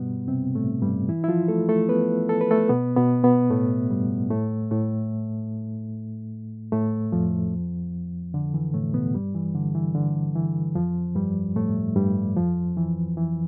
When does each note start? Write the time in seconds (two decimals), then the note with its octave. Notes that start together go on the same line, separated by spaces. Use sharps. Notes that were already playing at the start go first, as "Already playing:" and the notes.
Already playing: G2 B2 G3 B3
0.28 C3 C4
0.55 A2 A3
0.82 G2 G3
1.08 E3 E4
1.24 E4
1.28 F3 F4
1.48 A3 A4
1.69 A3 A4
1.89 B3 B4
2.29 A4
2.41 B4
2.51 A3 A4
2.69 B2 B3
2.96 B2 B3
3.23 B2 B3
3.50 A2 A3
3.90 G2 G3
4.31 A2 A3
4.71 A2 A3
6.72 A2 A3
7.12 F2 F3
8.34 D3
8.54 E3
8.73 A2 A3
8.94 B2 B3
9.14 G2 G3
9.34 E3
9.55 D3
9.75 E3
9.95 D3
10.35 E3
10.75 F2 F3
11.15 G2 G3
11.56 A2 A3
11.96 G2 G3
12.37 F2 F3
12.77 E3
13.17 E3